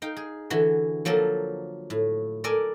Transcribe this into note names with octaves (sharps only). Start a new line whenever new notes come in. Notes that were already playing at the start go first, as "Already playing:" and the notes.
D#4 F5 G5
G#4
D3 E3 F#4
F3 F#3 A#3 A4 A#4
A2
A4 A#4 D5 G#5